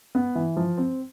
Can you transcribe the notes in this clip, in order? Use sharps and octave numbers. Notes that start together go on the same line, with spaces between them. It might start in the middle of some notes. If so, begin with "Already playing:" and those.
B3
E3
F3
C4